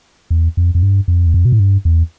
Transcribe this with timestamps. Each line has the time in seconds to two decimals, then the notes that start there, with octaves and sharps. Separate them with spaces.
0.30 E2
0.57 F2
0.75 F2
0.83 G2
1.08 F2
1.26 E2
1.34 F2
1.45 B2
1.52 A2
1.60 G2
1.85 E2